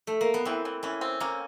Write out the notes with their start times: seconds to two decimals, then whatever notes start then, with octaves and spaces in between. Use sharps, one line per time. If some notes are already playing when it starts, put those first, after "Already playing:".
0.07 A3
0.21 A#3
0.34 B3
0.45 E3 C4
0.65 E3
0.83 E3 C#4
1.01 C4
1.20 A#3 C#4